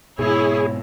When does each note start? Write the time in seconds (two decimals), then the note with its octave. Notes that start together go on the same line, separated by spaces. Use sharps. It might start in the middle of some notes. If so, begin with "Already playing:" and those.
0.19 G#2 B2 E4 G#4 C#5